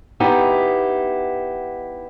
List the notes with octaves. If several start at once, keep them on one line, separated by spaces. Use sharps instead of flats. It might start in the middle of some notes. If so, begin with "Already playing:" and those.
B3 D#4 E4 G4